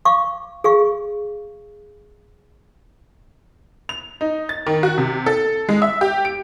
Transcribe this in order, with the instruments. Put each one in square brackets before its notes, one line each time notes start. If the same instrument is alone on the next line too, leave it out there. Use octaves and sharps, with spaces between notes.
[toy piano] F5 C#6 D6
G#4 F5 C#6
[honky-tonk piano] F7
D#4
A6
D#3
F#4
C3
A4
G#3
E5
G4
D7